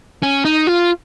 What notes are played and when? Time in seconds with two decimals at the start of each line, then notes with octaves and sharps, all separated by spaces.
0.22 C#4
0.45 D#4
0.67 F4